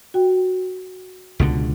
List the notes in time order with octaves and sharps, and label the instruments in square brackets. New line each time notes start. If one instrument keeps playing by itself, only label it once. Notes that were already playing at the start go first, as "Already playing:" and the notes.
[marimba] F#4 G5
[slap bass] C#2 B2 D3